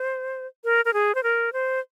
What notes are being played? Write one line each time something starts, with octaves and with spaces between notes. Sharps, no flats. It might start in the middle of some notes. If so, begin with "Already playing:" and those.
Already playing: C5
A#4
A#4
G#4
C5
A#4
C5